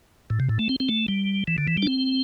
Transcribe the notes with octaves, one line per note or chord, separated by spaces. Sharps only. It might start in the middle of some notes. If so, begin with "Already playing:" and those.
A2
C3
A2
A3
C4
C4
A3
G3
E3
D3
E3
G3
D4
C4